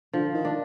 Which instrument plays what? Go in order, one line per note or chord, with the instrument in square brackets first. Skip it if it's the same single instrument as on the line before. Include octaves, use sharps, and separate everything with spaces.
[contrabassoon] D3 [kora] F3
[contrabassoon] D#3
[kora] D4